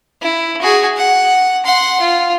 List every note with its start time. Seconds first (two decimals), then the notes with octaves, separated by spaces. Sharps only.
0.22 E4
0.62 F#4 G#4
0.97 F#5
1.65 F#5 C6
2.01 F4